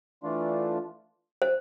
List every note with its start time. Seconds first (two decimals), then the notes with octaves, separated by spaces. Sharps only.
0.23 E3 A3 D4 F4
1.42 C5